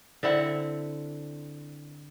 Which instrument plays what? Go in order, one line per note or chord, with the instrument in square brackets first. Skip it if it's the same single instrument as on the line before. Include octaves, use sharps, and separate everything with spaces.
[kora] D3 C4 E4 F#5